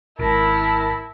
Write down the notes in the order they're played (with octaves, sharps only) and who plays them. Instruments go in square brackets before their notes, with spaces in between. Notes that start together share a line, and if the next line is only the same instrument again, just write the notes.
[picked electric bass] G#1 [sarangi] E4 [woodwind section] A#4 A5